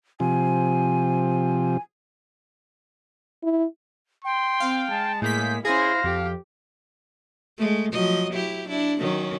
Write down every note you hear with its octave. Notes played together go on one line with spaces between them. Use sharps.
C3 F3 G#5
E4
G5 C6
C4 F5
G#3 A5
A2 A#3 G#4 G6 B6
C#4 E4 G#4 C5 F5 A#6
F2 G4
G#3 A3
F3 F#3 D#5
F#3 E4 G4
D4 E4
D#3 F#3 C#4